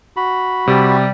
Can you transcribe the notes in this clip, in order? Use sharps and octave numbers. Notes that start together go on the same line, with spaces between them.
F#4 B5
C3 G3